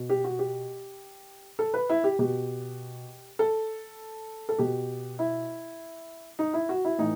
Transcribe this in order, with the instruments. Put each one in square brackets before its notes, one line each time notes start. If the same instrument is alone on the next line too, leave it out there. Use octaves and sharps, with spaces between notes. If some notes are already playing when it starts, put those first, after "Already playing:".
Already playing: [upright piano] B2
G4
F#4
G4
A4
B4
E4
G4
B2 G4
A4
A4
B2 G4
E4
D#4
E4
F#4
E4
A2 E3 D#4